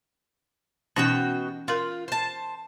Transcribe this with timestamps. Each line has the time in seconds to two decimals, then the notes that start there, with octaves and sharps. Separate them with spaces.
0.96 B2 E3 C#4 D#4 F#4 G5
1.68 F4 A#4 C6
2.08 C5 A5